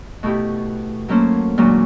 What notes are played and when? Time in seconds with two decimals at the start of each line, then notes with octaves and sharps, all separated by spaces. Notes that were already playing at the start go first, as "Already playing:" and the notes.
0.23 B2 A3 B3 E4 G4
1.08 F#3 A3 A#3 C#4 A4 C5
1.58 D2 A#2 F#3 G#3 C#4 C#5